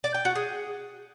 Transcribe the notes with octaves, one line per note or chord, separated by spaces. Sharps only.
D5
G5
F#4
G#4